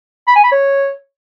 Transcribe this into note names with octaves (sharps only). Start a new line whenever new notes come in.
B5
G#5
B5
C#5